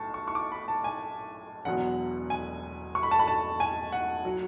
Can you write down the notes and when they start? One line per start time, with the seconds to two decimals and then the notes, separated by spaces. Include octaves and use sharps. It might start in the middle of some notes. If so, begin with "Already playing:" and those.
Already playing: B1 A2 A5 C#6
0.14 C#6
0.28 C#6
0.35 D6
0.52 B5
0.68 A5
0.84 G#5
1.65 E1 E2 B2 F#3 F#5
2.30 G#5
2.95 C#6
3.03 B5
3.11 A5
3.19 B5
3.28 A5
3.60 G#5
3.92 F#5
4.25 F#3